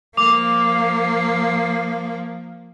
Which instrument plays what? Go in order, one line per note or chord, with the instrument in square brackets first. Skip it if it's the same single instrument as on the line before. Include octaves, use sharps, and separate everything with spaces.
[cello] F3 A#3 [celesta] D6 F7